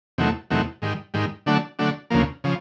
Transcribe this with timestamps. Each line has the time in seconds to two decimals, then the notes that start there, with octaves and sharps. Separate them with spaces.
0.18 E2 C3 D#3 F#3 A3
0.50 E2 C3 D#3 F#3 A3
0.82 G#2 D#3 G3
1.14 G#2 D#3 G3
1.46 D3 F#3 A3 D4
1.79 D3 F#3 A3 D4
2.10 D2 C#3 F3 A#3
2.44 C#3 F3